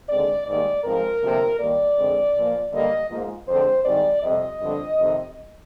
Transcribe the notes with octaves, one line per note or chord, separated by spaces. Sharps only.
D#2 D3 G#3 C4 D5
G#2 D#3 G3 A#3 D5
G#2 F3 G#3 C4 A#4
D2 C3 F3 A#3
D#2 D#3 G3 A#3 D5
F2 D3 G#3 C4
A#2 F3 A#3
G2 D3 G3 A#3 D#5
G#2 F3 A#3
F2 D3 G#3 C4 C5
G#2 D#3 G3 C4 D5
F2 C3 G3 C4 D#5
G2 D3 F3 C4
F2 C3 D#3